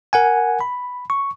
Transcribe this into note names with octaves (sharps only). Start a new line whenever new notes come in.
A#4 F#5 G#5
B5
C#6